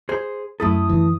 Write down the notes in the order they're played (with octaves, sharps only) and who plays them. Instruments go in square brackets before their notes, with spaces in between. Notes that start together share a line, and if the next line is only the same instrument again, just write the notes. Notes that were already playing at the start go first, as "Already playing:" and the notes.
[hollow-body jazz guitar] G#4 C5
[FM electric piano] F#2 D#6 [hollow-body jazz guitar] A3 E4 A4
[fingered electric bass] E3